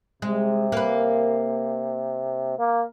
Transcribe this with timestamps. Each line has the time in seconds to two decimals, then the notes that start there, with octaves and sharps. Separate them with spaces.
0.22 C3 G#3
0.72 A#3 B4
2.59 A#3